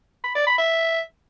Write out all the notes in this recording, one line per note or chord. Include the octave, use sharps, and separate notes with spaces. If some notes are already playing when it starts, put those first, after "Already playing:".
B5
D5
B5
E5